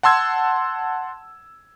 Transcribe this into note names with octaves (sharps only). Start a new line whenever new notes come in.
F#5 A5 C6 E6 G#6